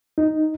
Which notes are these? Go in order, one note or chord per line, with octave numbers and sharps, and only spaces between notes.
D#4